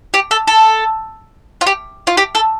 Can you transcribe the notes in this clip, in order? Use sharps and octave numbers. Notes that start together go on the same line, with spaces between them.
G4
A4
A4
F4
G4
F4
G4
A4